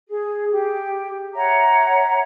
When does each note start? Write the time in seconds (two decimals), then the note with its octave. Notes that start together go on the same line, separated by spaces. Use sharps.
0.08 G#4
0.51 G4
1.35 C#5 E5 F#5 A#5